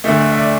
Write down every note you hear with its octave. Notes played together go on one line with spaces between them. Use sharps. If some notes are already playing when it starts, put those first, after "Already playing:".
D2 D3 A3 E5
E5
D5